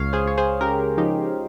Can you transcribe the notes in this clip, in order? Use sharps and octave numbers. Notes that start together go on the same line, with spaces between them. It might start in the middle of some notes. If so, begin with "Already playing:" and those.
Already playing: C#2 C#5 F5
G#4 C5
C#2 C#5
G#4 C5
C#3 G4 A#4
F3 D#4 G4